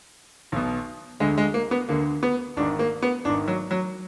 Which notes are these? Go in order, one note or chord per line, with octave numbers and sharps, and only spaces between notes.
B1 B2
D2 D3 G#3
G#3
A#3
B3
D2 D3 A#3
B3
G#1 G#2 D#3 D4
A#3
B3
G#1 G#2 D#3 D4
F#3
F#3